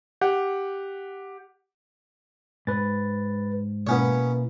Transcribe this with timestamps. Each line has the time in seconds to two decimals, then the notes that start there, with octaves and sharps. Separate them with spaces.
0.21 G4 F#5
2.67 G#2 B4 A6
3.87 B2 A#3 B3 C#4 E4 C#5